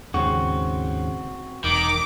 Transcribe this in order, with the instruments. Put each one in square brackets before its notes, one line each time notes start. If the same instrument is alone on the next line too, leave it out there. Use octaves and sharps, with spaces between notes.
[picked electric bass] D#2 G#2 C#3 [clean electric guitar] C4 F#4
[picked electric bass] E1 [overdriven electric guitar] D#3 [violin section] D6